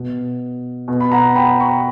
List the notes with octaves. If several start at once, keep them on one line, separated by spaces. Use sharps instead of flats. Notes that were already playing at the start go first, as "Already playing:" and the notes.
Already playing: B2
B2
B5
F#5 A#5
G5 B5
A#5 C#6